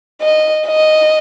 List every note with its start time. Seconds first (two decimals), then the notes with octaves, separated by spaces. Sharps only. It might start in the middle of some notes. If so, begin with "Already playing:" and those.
0.22 D#5
0.67 D#5